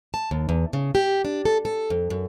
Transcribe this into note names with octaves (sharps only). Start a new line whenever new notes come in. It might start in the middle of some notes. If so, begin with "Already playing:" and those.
A5
D#2
E2
C#3
G4
D4
A4
A4
F2
F#2